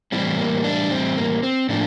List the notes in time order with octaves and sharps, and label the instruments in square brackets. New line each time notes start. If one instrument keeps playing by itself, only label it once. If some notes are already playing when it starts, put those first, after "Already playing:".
[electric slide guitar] A2 E3 G3 C4
A#3
D4
C4
A#3
C4
A2 F3 A#3 D4